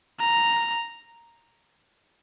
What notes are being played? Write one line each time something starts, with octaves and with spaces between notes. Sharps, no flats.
A#5